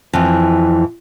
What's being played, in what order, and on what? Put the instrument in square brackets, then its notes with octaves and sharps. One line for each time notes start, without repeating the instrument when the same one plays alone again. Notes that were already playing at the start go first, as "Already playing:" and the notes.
[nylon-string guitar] F2 E3